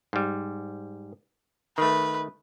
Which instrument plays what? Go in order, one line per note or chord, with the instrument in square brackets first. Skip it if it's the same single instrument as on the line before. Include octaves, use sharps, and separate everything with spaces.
[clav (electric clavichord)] G#2 G3
[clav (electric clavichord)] D#3 A3 [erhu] B4